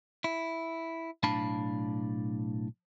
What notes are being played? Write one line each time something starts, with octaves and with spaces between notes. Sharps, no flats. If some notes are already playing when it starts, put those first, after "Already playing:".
E4
B1 A2 D4 F5 A5 B5